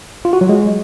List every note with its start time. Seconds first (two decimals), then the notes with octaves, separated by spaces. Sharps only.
0.25 F4
0.33 F#4
0.41 F#3
0.49 G#3